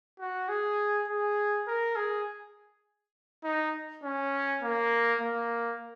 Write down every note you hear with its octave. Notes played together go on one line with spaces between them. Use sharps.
F#4
G#4
G#4
A#4
G#4
D#4
C#4
A#3
A#3